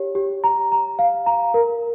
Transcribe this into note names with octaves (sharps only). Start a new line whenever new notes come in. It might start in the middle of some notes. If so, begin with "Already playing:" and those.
Already playing: G4 C#5
G4
A#5
A#5
F5
A#5
A#4